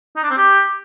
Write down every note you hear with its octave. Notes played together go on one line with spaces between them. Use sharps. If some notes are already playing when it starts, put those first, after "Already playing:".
D#4
D4
C4
G4